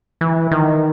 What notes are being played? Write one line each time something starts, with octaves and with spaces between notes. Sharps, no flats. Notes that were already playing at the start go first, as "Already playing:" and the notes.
E3
D#3